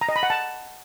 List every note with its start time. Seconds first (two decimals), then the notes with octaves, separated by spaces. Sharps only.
0.01 A#5
0.09 D#5
0.16 B5
0.23 F#5
0.30 A5